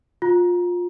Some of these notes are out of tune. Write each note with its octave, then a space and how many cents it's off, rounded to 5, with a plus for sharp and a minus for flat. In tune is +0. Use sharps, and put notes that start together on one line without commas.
F4 +20 A#5 +20